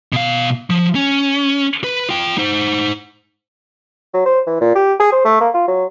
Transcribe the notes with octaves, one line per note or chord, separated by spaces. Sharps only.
B2 F5
F3
C#4
B4
F4 G5
D#4 C5
F#3
C5
E3
A#2
G4
G#4
C5
A3
A#3
F4
F#3